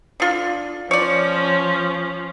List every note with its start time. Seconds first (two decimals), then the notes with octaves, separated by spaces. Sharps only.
0.20 D3 F4
0.91 F3 C#4 C#5 D5